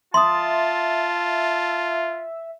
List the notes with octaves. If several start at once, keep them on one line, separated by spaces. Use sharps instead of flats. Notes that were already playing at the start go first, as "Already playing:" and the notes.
F4 E5 A5 C6 D#6